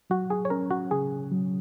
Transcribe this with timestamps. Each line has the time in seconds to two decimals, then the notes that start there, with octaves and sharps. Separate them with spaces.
0.10 F#3 F#4
0.30 G#4
0.45 C#5
0.50 C#4 A#4
0.71 F#4
0.91 C#3 G#4
1.32 F#3